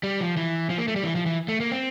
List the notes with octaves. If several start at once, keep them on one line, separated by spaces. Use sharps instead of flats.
G3
F3
E3
F3
A#3
A3
G3
E3
F3
E3
A3
A#3
C4